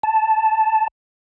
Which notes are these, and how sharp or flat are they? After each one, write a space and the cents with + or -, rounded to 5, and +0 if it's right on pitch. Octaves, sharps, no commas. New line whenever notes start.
A5 -5